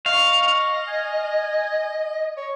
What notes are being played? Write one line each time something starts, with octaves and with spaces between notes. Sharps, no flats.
D#5 F5 C#6
G#5
C#5